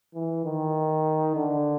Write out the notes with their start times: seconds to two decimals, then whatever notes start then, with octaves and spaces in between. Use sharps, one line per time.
0.14 E3
0.45 D#3
1.36 D3